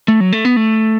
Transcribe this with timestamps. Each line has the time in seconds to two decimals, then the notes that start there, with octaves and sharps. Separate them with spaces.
0.08 A3
0.20 F#3
0.32 A3
0.45 B3
0.56 A3